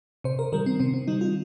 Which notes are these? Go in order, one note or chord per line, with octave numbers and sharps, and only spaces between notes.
C3 C5
A#4
D#3 G3 A#4
C4
C3 C4
C4
D#3 G3 D#4
F4